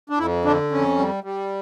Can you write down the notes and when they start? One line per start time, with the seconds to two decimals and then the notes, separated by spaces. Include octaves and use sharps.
0.10 D4
0.19 F2 E4
0.45 D3 D4
0.72 F2 C#4
0.98 G3
1.24 G3